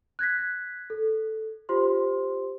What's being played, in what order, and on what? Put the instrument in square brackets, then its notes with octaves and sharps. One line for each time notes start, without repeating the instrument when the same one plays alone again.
[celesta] F#6 G#6 A#6 B6
A4
F4 G4 C5 C6